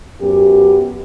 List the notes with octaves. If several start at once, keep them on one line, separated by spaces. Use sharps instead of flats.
F#2 B3 G4